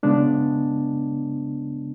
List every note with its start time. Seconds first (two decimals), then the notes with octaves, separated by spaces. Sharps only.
0.03 C#3 G#3 B3 D4